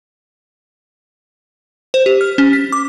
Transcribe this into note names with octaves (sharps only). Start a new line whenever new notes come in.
C5
G4
F6
C#4
B6
D6